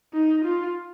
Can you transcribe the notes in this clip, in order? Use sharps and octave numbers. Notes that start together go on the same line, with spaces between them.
D#4
F4